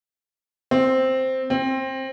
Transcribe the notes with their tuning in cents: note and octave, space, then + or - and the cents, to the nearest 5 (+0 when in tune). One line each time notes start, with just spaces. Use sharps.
C4 +0
C4 +20